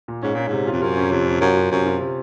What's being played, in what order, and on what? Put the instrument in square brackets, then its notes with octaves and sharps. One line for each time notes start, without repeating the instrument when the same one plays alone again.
[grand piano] A#2
[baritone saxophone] G#2 [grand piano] C#4
[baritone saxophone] A#2 [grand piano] C#4
[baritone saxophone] G#2 [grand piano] C3
[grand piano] F4
[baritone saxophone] F2
[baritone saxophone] F#2 [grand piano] F4
[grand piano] C#4
[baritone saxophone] F2 [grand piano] C3
[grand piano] C#4
[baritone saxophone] F#2 [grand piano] F4
[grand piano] F4
[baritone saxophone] F#2 [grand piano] C3
[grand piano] F4
C3